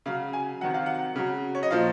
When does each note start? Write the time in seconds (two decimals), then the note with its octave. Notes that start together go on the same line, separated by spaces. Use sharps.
0.06 C#3 F#3 F5
0.33 G#5
0.61 C3 D#3 F#3 F#5
0.74 F5
0.86 F#5
1.16 C#3 F#3
1.55 C#5
1.63 D#5
1.71 A#2 F3 F5